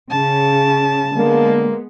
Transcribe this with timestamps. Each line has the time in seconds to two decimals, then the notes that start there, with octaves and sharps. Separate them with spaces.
0.10 C#3 A5
1.15 D3 G#3 A#3 B3